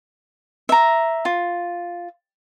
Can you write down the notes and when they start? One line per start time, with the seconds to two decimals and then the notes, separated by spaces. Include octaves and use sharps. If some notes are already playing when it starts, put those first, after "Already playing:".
0.69 E5 A#5
1.25 F4